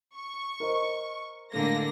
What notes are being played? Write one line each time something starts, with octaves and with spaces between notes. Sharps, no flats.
C#6
A#4 C5 D#5
A2 D3 G#3 A#3 A#6